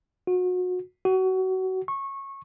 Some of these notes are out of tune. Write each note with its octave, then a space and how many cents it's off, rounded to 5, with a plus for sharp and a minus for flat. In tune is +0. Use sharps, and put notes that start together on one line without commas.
F#4 -30
F#4 +25
C#6 -20